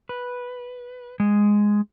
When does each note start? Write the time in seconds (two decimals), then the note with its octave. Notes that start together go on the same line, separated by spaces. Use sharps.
0.09 B4
1.20 G#3